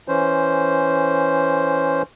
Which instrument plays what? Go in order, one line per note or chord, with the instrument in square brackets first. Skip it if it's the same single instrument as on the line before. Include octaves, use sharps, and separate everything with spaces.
[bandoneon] E3 C#4 C5